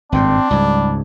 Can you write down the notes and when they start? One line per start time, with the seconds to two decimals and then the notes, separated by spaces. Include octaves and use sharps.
0.12 G#1 G2 A#2 C4 D4
0.51 C#2 G#2 G3